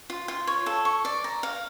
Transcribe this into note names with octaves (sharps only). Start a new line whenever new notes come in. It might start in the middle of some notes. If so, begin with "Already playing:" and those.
F4
F4
C#5
A4
C#6
D5
A#5
F5